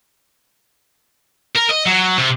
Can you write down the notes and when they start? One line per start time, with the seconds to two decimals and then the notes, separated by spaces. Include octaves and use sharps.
1.55 A#4
1.69 D#5
1.86 F#3
2.18 C3